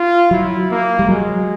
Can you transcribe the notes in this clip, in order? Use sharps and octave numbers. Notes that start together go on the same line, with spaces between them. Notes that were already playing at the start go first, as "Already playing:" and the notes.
Already playing: F4
F#3 E4
A#3
G3
F#3 G#3